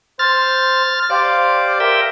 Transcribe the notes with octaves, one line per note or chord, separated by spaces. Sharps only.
C5 F6 A6
G4 C5 D5 F5
A#4 E5 G5